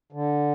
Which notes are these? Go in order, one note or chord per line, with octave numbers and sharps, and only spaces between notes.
D3